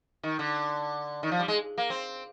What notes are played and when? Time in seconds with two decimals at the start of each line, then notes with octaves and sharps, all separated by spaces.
0.23 D#3
0.39 D3
1.23 D#3
1.32 F3
1.39 G3
1.48 G#3
1.78 A#3
1.90 C4